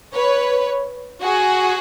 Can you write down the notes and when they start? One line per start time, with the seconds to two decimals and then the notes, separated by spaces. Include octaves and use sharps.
0.14 B4 C#5
1.22 F#4 G#4